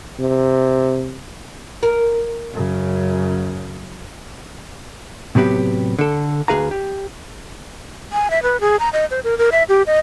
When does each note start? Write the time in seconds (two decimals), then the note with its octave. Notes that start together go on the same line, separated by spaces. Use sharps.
0.19 C3
1.83 A#4
2.54 F#2 C#3
5.35 A2 C3 F#3 B3 G4
5.99 D3 A4
6.48 D2 B2 G#4 B4 F5 A#5
6.71 G4
8.13 G#5
8.31 E5
8.43 B4
8.61 G#4
8.79 A#5
8.93 D#5
9.11 C5
9.24 A#4
9.38 A#4
9.52 E5
9.69 G4
9.87 D#5